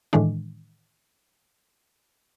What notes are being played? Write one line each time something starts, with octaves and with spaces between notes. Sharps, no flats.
A2 D#3 E3 G#3 D4